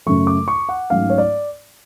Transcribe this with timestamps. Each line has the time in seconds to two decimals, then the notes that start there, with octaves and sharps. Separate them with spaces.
0.06 F#2 C#3 F#3 A3 C#6
0.27 D6
0.48 C#6
0.69 F#5
0.90 G#2 F#3 A3 C#4 F5
1.10 C#5
1.18 D5